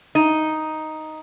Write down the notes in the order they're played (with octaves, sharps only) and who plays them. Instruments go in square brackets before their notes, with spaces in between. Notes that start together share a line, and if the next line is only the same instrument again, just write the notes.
[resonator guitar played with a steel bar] D#4